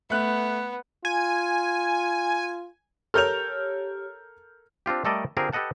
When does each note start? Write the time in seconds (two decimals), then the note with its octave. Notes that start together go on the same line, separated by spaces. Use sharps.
0.10 A3 B3 F#6
1.05 F4 G#5
3.14 G4 A4 A#4 C#5 F6 G6 F7
4.86 C4 D4 F4 G4
5.05 G3 A3 A4 A#4 D5 D#5
5.37 D3 C4 F4 G4 G#4 A#4
5.53 G4 A4 B4 D#5 F#5 A5